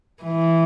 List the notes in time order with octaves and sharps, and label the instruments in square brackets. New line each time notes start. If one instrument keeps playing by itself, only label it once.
[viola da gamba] E3